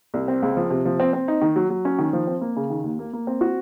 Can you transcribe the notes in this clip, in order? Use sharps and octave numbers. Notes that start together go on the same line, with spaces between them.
C2
C4
C#2
F3
C3
F3
C4
C4
D#4
D#3
F#3
F#3
C#4
D#3
F3
C4
A#3
C#3
D#3
D#2
A#3
A#3
C4
F#4